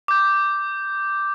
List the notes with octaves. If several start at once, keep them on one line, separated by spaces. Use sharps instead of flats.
D6 G6